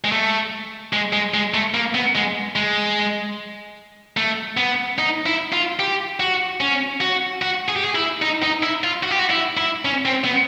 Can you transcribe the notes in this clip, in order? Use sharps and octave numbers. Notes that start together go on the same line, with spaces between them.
G#3
A3
G#3
G#3
G#3
A3
A#3
B3
G#3
G#3
A3
B3
D#4
E4
F4
G4
F#4
C#4
F#4
F#4
G#4
G4
G#4
E4
D#4
D#4
E4
F4
F#4
G4
F#4
E4
E4
C#4
C4
B3